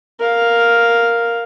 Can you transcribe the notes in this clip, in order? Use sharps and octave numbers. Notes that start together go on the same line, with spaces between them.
A#4 F5